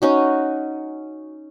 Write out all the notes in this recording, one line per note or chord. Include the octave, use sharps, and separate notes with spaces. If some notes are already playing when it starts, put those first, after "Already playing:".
C#4 D#4 F#4